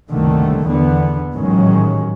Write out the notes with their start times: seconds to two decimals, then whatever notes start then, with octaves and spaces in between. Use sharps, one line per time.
0.11 F#1 C2 D3 D#3 A3
0.65 E2 D3 B3
1.33 A1 G#2 D#3 F#3 G#3 C#4